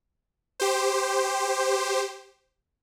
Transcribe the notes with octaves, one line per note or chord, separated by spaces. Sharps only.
G4 C5